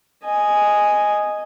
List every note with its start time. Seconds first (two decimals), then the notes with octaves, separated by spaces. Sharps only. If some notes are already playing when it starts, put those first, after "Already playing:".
0.25 D#5 G#5